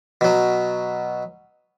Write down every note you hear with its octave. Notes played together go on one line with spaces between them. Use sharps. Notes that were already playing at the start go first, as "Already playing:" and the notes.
B2 F#3